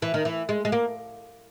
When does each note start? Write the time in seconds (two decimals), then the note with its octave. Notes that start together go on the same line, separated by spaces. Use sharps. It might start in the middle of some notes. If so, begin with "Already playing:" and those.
0.02 E3
0.14 D#3
0.25 E3
0.49 G#3
0.65 G#3
0.72 A#3